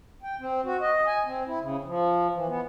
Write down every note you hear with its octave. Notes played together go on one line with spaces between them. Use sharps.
G5
C4
F#4
D#5
G#5
C4
E4
C#3
F3
E3
B3